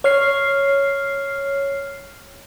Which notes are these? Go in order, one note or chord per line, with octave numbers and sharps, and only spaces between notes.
C#5 F6 C7